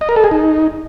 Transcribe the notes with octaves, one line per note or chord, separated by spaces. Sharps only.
D#5
A#4
A4
G#4
D#4